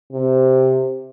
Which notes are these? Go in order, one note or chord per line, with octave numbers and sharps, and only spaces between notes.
C3